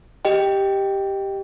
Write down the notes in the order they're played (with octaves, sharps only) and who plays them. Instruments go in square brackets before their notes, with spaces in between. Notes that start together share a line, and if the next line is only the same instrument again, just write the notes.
[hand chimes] G4 D#5 G5